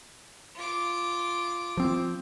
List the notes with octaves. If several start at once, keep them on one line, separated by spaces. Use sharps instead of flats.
F4 D6
F3 C4